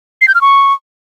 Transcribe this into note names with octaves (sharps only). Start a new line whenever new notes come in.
C7
G6
F6
C#6